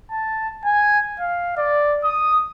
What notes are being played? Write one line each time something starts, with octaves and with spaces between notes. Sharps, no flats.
A5
G#5
F5
D5
D#6